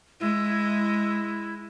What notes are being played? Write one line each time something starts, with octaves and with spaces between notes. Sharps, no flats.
G#3 E4